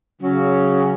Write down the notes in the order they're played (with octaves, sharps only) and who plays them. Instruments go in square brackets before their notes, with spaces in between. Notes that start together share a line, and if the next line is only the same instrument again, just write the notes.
[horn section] C#3 F#3 C#4